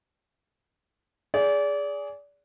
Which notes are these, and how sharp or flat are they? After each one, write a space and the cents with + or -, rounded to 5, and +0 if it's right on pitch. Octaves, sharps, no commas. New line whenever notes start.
G#4 +0 D5 -30